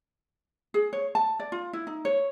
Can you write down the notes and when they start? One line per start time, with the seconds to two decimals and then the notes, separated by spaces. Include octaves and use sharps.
0.74 G#4
0.93 C#5
1.15 A5
1.40 D5
1.52 F4
1.73 E4
1.87 D#4
2.05 C#5